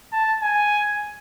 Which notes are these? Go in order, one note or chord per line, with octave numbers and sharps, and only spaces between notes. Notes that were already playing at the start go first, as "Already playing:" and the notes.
A5
G#5